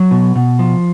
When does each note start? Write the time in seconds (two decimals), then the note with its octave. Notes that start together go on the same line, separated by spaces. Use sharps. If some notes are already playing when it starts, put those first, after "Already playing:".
Already playing: F#3
0.11 B2
0.35 B2
0.59 F3